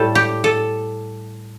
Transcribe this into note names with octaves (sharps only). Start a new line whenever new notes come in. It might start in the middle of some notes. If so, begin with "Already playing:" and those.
Already playing: A2 G3 A4
G4
A4